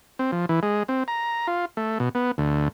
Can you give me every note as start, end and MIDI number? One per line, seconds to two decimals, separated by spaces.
0.19 0.31 60
0.32 0.46 53
0.49 0.60 52
0.63 0.83 56
0.88 1.03 60
1.08 1.47 82
1.47 1.65 65
1.77 1.98 57
2.00 2.09 47
2.15 2.31 59
2.38 2.68 38